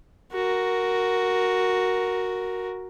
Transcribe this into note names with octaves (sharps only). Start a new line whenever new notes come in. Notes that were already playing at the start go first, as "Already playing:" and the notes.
F#4 A#4